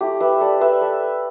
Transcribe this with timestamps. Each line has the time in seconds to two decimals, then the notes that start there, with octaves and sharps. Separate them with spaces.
0.01 A3 E4 G4
0.20 B4 E5
0.41 A4 D5
0.61 B4 E5
0.81 A4